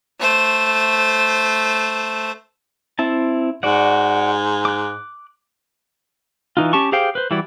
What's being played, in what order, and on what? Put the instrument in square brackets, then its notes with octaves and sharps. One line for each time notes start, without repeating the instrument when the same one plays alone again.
[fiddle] A3 C5
[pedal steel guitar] C4 E4 A5
[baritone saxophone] G#2 [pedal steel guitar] F#4 D5 F#5
[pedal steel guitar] D6 F#6
E3 D#4 F4
C#4 G4 A5 C#6
G4 G#4 C5 F5 G5
B4 C5
E3 G3 E4 F#4 D5